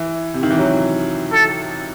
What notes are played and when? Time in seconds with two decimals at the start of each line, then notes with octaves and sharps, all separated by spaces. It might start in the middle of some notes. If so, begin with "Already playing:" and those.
Already playing: E3
0.34 C3
0.43 D#3
0.50 E3
0.59 F#3
1.33 A4